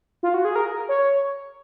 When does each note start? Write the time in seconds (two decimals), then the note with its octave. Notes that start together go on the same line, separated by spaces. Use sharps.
0.23 F4
0.34 F#4
0.45 G#4
0.56 A#4
0.89 C#5